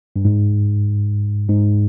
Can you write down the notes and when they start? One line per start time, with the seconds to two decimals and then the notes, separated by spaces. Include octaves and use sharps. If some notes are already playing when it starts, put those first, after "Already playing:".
0.16 G2
0.25 G#2
1.48 G#2